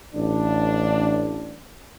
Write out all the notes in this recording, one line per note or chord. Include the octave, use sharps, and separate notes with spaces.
A1 D4